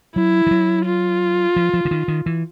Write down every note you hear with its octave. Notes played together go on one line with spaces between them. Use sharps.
F#3 E4
F3
F#3
F4
F3
F3
D3
D#3
D#3
E3